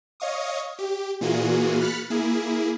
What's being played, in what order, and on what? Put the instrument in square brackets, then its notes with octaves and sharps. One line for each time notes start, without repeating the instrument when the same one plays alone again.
[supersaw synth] C#5 D#5 F5 C#6 D#6
G4
A#2 E3 A#3 F4 F#4 G#4
B5 F6 F#6 A6 B6 C#7
A#3 E4 G#4